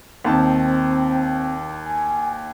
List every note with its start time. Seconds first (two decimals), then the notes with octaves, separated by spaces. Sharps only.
0.25 D#2 D#3 C4 A5
1.85 G#5